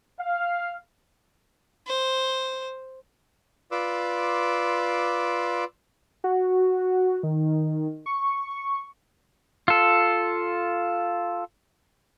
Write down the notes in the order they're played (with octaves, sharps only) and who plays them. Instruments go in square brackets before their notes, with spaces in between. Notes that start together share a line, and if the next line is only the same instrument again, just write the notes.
[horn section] F5
[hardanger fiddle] C5
[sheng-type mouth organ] F4 B4 D5 C6 D6 E6
[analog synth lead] F#4
D#3
C#6
[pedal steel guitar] F4 A4